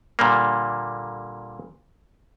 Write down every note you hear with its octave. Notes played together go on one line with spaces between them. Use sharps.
A#2 D3 G3 A#3